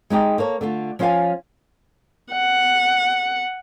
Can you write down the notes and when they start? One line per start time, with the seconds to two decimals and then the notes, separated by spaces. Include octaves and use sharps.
0.10 G#3 D#4 G4 D#5
0.38 A#3 A4 C#5
0.61 D3 A3 F4
0.99 F3 C#4 F4 C#5 F5 G#5
2.33 F#5